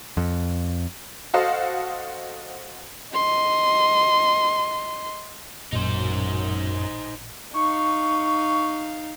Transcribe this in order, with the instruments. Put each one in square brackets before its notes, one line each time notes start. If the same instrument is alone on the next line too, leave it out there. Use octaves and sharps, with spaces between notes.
[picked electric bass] F2
[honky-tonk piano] F#4 A4 C5 D#5 F5 F#5
[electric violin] D#5 C6
[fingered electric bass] A1 A#2 [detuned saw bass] F#2 [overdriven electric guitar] D#4 C5
[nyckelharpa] D#4 F5 [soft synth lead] C#6